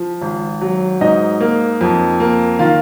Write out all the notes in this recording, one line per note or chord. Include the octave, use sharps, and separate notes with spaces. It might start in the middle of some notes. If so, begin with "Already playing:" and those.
Already playing: F3
G#1
F#3
G#2 D#4 D#5
A#3
F2
A#3
D#3 F4 F5